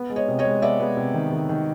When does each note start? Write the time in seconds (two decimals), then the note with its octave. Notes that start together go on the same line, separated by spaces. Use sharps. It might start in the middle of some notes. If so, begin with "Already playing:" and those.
Already playing: B3
0.10 G#3
0.16 C#5 D#5
0.28 C3
0.39 C#5 D#5
0.45 G#3
0.62 B3 D5 E5
0.80 B3
0.97 C3
1.14 D#3
1.33 D#3
1.49 D#3